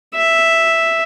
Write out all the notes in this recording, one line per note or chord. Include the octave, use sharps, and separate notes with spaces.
E5